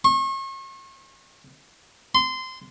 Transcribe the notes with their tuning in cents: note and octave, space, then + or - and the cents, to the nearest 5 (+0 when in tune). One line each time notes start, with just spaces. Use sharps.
C#6 -40
C6 -20